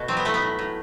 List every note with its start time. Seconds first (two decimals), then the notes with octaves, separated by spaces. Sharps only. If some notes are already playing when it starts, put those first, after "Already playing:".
Already playing: B2 A3 F#4
0.08 F#3 C4
0.17 B3
0.25 A2 A3
0.34 B3
0.42 A2
0.59 A2